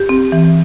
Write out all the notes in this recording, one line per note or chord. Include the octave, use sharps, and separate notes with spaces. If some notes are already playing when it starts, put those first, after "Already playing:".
Already playing: G4
C4
E3